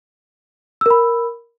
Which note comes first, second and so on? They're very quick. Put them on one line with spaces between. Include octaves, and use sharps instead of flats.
E6 A#4 B5